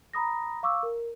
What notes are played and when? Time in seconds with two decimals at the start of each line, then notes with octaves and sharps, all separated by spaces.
0.13 A#5 B5 D#6 A#6
0.63 F5 C#6 D6 E6
0.83 A#4